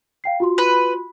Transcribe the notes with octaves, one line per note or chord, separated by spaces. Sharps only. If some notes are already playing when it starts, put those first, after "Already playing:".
F5 G5 C7
F4 F#4 C6
B4